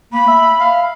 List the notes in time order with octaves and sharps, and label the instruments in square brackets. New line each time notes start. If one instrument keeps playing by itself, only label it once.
[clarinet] A#3 [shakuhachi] B5
[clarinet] E5
F5